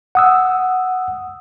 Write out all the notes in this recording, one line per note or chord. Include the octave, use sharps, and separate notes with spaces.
F#5 D#6 E6